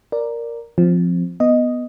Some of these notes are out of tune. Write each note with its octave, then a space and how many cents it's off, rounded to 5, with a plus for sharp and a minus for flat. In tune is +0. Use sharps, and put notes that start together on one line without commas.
A#4 +0 D5 +0
F3 +0 C4 -5
B3 +0 D#5 +0